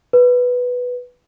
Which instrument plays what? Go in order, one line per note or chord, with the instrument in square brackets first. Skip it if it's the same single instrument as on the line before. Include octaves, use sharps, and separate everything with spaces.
[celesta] B4